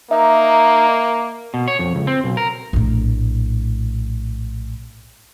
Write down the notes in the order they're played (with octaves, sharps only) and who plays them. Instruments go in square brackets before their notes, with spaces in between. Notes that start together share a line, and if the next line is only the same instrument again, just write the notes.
[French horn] A#3 [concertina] D#4 [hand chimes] E5
[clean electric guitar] B2
C#5
F2
C#2
C4
B1
A#4
[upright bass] A#1 A2